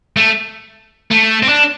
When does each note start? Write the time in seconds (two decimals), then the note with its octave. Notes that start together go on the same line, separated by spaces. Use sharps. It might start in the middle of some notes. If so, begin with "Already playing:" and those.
0.17 A3
1.11 A3
1.43 C4
1.49 D4